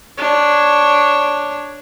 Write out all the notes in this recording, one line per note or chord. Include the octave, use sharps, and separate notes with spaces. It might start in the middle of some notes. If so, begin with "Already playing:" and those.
D4 C#5